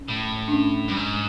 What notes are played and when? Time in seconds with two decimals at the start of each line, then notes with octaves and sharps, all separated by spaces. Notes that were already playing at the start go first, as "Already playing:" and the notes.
Already playing: C#4
0.08 A2
0.48 D4
0.52 C#4
0.88 G2
0.97 G#2